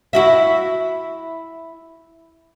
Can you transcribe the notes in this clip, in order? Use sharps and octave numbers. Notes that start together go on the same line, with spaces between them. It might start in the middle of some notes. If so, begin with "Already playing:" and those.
E4 F#4 E5